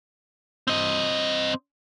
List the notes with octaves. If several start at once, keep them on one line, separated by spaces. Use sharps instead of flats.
C4 D#5